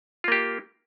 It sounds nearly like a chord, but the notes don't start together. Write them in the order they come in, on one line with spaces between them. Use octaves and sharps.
F4 A#3 G4